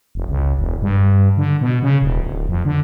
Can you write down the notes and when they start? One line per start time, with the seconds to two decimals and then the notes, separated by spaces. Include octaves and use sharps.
0.15 F1
0.29 C#2
0.59 E1
0.82 G2
1.37 D3
1.61 B2
1.82 C#3
2.02 D#1
2.21 D1
2.49 F2
2.65 D3